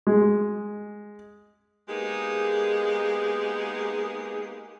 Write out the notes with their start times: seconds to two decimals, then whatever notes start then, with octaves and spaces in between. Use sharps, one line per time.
0.07 G#3
1.88 G#3 A#3 B3 D#4 G4 G#4